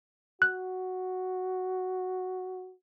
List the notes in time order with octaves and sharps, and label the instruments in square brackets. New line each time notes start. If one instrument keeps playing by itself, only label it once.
[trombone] F#4 [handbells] F#6